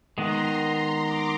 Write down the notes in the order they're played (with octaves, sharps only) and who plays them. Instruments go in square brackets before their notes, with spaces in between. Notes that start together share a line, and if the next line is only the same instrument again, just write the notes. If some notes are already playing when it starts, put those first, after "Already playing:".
[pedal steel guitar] D#3 G#3 B3 [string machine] A#5 C6
[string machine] C6 D6